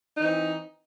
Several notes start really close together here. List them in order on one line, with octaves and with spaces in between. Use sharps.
D#4 E3 C4